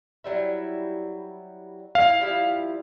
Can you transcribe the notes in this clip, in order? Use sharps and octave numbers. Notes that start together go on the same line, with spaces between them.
F#3 G3 E4
E4 D#5 F5
F3 G3 E4